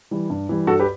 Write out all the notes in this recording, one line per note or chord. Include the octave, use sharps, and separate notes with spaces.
E3 G3
G2
E3 G3
G2 F#4 A4
G4 B4